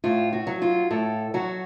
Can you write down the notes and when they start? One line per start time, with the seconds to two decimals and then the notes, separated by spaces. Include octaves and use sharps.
0.04 A2 F4
0.33 F#4
0.47 F#3
0.62 F4
0.91 A2 A4
1.34 F#3 F#4